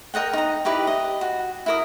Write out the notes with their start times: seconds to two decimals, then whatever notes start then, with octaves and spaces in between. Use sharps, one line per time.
0.14 A#4 D#5 F#5 G5
0.33 D#4 A#5
0.65 D#4 E4 G4 B4
0.87 D#5
1.21 F#4
1.66 E4 A#4 D#6